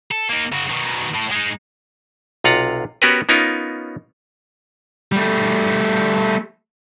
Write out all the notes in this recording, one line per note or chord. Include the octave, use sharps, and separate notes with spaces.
A4
A#3 D#4
C#3 F#4
B2 D#3
A2
G#3 D#4
B1 C3 F4 F#5 A#5
B3 C#4 F#4 G4 A#4 B4
B3 C#4 D#4 F4 A#4
G3 A3